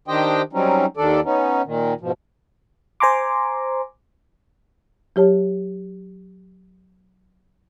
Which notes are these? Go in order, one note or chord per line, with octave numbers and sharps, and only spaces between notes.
D#3 D4 G4 C5 D#5 G5
F#3 G3 C4 C#4 D#4
D#2 D#3 D4 A4 D5
B3 C#4 D#4
A#2 D#3
G#2 B2 F3
C5 G#5 A#5 C6 D6
F#3 G4 C#5 A5